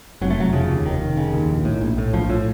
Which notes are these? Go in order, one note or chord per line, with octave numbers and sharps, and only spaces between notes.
F1 F#3
A3
F1 F#3
C#3 F3
D#2
F1 D#3
F1
C#3
D#2
A#1
A2
A#1
A2
A#1 F3
A2